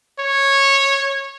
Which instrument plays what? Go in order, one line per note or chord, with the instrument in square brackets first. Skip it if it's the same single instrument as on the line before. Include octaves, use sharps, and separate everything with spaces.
[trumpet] C#5